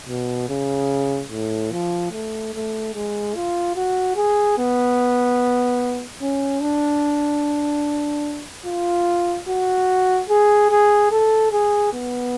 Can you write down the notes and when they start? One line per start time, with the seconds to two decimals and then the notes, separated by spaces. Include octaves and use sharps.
0.09 B2
0.49 C#3
1.31 A2
1.72 F3
2.12 A3
2.54 A3
2.95 G#3
3.35 F4
3.76 F#4
4.16 G#4
4.58 B3
6.21 C#4
6.61 D4
8.66 F4
9.48 F#4
10.29 G#4
10.70 G#4
11.11 A4
11.52 G#4
11.93 B3